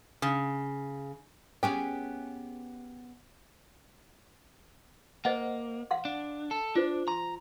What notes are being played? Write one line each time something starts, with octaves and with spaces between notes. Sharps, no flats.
C#3
B3 C#4 G4 G#4
A#3 C5 D#5 F#5
F5 F#5 C6
D4
A4
D4 F4 C5
A#5 C6